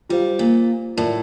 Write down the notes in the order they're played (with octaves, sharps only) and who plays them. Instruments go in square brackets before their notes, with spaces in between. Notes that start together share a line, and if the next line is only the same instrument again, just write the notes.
[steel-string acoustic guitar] G3 [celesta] F4 C5 F5
[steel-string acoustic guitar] A#2
[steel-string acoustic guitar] A2 [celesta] F4 A#4 D5 A5